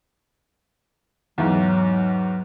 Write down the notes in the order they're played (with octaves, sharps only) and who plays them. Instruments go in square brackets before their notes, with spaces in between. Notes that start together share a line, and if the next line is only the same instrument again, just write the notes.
[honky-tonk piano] E2 G#2 [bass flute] F#3